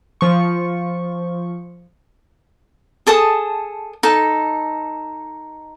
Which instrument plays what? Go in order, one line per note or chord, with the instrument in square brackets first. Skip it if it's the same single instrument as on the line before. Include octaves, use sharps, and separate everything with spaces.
[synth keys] F3 C#6
[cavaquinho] G#4 A4 A5 D#6
D#4 A4